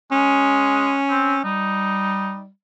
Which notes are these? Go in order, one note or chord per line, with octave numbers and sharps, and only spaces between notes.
G#3 C#4
C4
G3 D#4